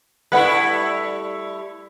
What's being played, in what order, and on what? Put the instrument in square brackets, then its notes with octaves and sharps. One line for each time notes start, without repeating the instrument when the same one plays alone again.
[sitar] G3 A3 E4 [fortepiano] B4 F#5 B5